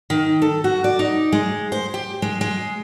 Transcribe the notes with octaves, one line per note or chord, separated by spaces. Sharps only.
D#3
A4
F#4
D5
D#4
G#3
C5
G4
G#3
G#3